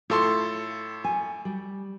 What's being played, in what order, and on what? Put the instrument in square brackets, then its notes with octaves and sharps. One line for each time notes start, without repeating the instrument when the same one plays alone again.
[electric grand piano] A2 A4 C6 [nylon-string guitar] F4
[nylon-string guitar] G#5
G3